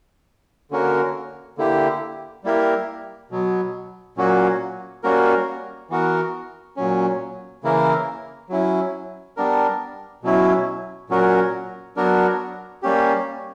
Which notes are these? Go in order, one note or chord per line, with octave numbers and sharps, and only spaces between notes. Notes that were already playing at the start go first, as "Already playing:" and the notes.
D3 A#3 C#4 F#4 A#4
D3 A#3 E4 G4
G3 A#3 E4 G4 A#4
B2 F#3 B3
A#2 F#3 A#3 C#4 F#4
G3 A#3 C#4 F#4 A#4
E3 B3 F#4 A#4
A#2 F#3 C#4
C#3 E3 A#3 E4 A#4
F#3 C#4 E4
G3 B3 D4 A#4
B2 F#3 C#4 E4
A#2 F#3 C#4 F#4 A#4
F#3 B3 D4 F#4 A#4
G3 A#3 C#4 G4